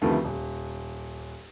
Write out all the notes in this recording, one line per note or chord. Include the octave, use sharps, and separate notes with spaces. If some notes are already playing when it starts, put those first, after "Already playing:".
D2 C3 D#3 F3 A3 B3
D#1